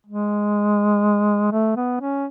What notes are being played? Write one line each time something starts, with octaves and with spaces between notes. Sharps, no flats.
G#3
A3
B3
C#4